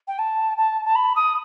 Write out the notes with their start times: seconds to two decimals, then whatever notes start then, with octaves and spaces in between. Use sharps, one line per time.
0.07 G5
0.18 A5
0.57 A5
0.85 A5
0.95 B5
1.16 D#6